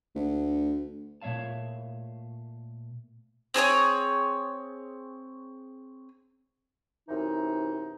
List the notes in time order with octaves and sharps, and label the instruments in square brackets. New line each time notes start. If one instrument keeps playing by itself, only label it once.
[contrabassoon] D2
[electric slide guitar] A#2 A3 C#5 E5 F5 A5
[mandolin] C4 G#4 C5 C#5
[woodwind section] F#2 C3 E3 D#4